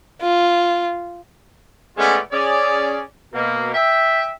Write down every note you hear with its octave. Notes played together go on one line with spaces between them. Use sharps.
F4
G#3 A3 B3 C#4 F4 D5
C#4 G#4 D5
B2 A#3
E5 G5